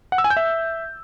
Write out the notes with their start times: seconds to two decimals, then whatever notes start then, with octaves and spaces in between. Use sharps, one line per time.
0.12 F#5
0.18 E6
0.24 G#5
0.30 G6
0.37 E5